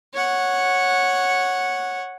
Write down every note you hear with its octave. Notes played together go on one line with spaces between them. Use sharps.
C#5 F#5